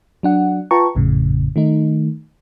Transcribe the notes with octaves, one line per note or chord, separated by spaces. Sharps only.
F#3 D4 F#5
F4 B4 G5 A5 A#5 C#6
G#1 F2 A2 C#3
D#3 A3 D#4